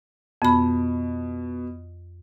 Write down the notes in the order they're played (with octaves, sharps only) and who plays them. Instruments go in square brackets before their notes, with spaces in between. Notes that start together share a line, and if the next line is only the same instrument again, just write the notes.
[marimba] F2 B5 [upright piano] B2